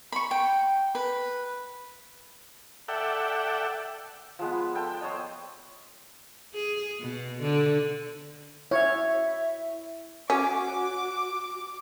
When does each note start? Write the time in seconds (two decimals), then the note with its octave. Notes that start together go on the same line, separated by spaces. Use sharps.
0.12 B5 C#6
0.31 G5
0.95 B4
2.88 A4 D5 E5 F#5 G5
4.39 F3 G#3 B3
4.75 A4 G5
5.01 C5 C#5 D#5
6.55 G#4
7.00 B2
7.42 D3
8.71 E4 C#5 E5
10.30 C#4 F#4 D6